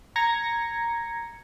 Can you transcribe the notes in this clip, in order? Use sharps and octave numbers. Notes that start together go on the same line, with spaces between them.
A#5 G#6 A#6 C#7